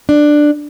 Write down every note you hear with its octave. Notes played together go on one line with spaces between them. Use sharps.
D4